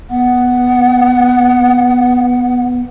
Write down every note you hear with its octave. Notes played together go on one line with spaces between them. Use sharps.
B3 F#5